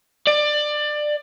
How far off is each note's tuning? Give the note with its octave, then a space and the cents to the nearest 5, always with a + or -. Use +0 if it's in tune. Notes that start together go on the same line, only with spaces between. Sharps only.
D5 +20